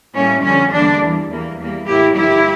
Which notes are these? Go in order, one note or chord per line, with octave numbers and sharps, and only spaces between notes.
A2 G3 A#3 C#4
F2 D3 G3 C#4
E2 D3 G3 A#3 D4
E2 E3 G3
E2 E3 G3 A#3
E2 E3 G3 A#3
A2 E3 A#3 E4 G4
G2 D3 F3 A#3 E4 G4